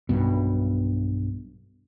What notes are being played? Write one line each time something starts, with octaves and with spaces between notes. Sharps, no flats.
B1 G2 B2